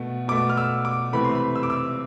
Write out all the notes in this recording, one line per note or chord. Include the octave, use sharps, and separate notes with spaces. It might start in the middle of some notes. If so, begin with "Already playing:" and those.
Already playing: B2 A3
B2 A3 D6
F6
E6
D6
C3 E3 A3 B5
C6
B5
E6
D6
E6